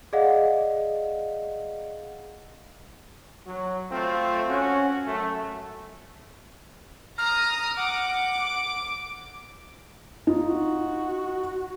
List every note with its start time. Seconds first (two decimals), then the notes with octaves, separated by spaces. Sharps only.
0.13 G#4 D5 D#5 F5 F#5
3.46 F#3
3.91 A3 C4 F4
4.49 C#4 F#4
5.05 F#2 A3
7.18 A#5 D#6 F6
7.77 F#5 D6
10.27 D#4 F4
10.48 F#4